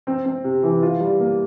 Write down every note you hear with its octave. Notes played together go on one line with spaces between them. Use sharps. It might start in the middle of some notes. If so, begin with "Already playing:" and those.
C4
C4
C3
E3
F4
G3
A#3